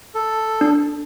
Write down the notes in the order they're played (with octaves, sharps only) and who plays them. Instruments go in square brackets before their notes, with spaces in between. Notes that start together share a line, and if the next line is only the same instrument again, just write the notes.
[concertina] A4
[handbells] D4